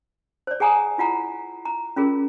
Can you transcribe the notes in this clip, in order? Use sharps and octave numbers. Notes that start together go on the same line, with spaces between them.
C5 D5
G#4 F#5 G#5 A#5 D#6
E4 F4 F#5 A#5
A#5
C#4 F4 G#4 A#4